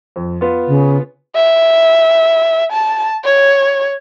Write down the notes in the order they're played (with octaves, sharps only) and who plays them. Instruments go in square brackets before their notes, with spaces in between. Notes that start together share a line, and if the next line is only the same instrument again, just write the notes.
[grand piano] F2
B3 F4
[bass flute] C#3
[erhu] E5
A5
C#5